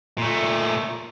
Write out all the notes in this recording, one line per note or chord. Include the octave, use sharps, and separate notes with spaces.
A#2 A3